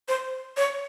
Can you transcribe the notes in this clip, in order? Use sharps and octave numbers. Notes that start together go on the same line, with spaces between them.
C5
C#5